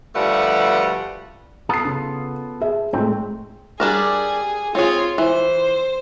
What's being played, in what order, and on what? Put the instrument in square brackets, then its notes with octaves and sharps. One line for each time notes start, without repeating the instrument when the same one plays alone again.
[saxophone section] D2 F3 G3 A3 B4 F#5
[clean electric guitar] B3 F4 A4 [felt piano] D#6 C7
[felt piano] C#3
G#4 E5
[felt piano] A2 G#3 A3 [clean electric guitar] C4
[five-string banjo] G3 D4 A#4 [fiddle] G#4
[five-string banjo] C4 G#4 [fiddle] F4 C#5
[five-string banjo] E3 [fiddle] C5